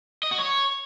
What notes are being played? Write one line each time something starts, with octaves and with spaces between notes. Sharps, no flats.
D#5
F#4
C#5